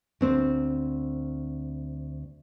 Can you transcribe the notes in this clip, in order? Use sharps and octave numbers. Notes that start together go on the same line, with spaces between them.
D2 C4 C5